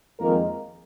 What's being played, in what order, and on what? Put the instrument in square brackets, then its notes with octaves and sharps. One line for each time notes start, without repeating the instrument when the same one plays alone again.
[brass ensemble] F2 D#3 G#3 A#3 A#4